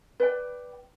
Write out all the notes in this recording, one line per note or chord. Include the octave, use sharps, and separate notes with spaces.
B4 D5 G5